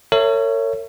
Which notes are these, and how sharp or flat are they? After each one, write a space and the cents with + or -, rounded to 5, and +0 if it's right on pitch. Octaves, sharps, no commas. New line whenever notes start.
A#4 -45 C#5 +0 E5 +10